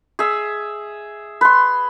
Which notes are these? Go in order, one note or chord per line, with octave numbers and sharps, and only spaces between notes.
G#4 E5
B4 C6